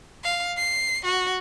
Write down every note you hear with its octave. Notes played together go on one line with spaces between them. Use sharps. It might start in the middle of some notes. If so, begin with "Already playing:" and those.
F5
C7
F#4